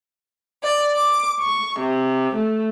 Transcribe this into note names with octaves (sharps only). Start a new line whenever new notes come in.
D5
D6
C#6
C3
A3